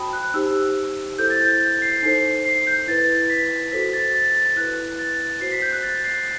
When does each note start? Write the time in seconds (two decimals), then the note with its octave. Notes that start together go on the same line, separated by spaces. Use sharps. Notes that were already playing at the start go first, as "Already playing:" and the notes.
Already playing: F#4 C5 G5 A5 B5 D#6
0.13 F#6
0.23 F#6
0.34 D#4 G4 C5 E6
1.18 E4 A4 C5 G6
1.30 A6
1.41 G6
1.61 G6
1.82 C7
2.03 D#4 A4 C5 C7
2.45 C7
2.67 G6
2.87 E4 B4 A6
3.30 B6
3.72 F#4 A4 C5 B6
3.93 A6
4.14 A6
4.35 A6
4.56 E4 B4 F#6
4.99 A6
5.41 F#4 C5 C7
5.52 B6
5.62 G6
5.72 F#6
5.83 A6
6.04 C7